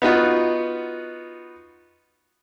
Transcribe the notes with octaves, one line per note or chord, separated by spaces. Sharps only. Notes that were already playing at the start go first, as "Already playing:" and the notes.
B3 D#4 F4 F#4